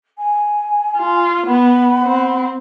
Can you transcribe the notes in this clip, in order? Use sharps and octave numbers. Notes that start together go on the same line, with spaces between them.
G#5
F4
B3 F#5 B5
C4